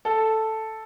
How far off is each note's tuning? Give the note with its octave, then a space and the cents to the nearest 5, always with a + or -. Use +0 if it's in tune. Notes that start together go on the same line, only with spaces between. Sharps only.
A4 +0 A5 +0